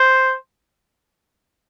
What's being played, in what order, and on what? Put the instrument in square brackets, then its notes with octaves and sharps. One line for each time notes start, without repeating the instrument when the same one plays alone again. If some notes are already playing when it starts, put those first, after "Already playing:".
Already playing: [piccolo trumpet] C5